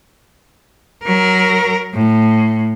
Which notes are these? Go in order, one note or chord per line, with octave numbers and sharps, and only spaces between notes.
F#3 A#4
A2